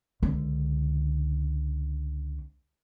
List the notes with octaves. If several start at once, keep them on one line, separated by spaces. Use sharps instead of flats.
C#2 D3